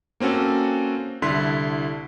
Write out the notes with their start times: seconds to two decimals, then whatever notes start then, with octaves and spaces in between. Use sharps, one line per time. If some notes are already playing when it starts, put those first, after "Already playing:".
0.20 A#3 C4 C#4 F#4 A4
1.22 C2 D3 E4 C6 B6